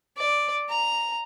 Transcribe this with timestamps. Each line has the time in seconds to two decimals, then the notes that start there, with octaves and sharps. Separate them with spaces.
0.17 D5
0.70 A#5